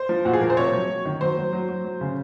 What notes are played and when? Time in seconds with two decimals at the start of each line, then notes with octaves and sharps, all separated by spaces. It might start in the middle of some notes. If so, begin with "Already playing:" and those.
Already playing: C5
0.09 F3
0.25 A#2 F#4
0.33 G#4
0.41 F3 A#4
0.50 C5
0.57 C3 C#5
0.73 F#3
0.89 F#3
1.05 D#3
1.21 F#3 C5
1.37 F#3
1.53 F#3
1.68 F#3
1.84 F#3
2.01 C#3